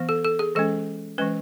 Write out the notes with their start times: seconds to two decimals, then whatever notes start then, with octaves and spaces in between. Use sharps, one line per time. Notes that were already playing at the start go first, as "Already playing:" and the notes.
Already playing: E3 B3
0.09 A4
0.24 A4
0.39 G#4
0.55 E3 G#3 C#4 A4
1.18 E3 G#3 C#4 B4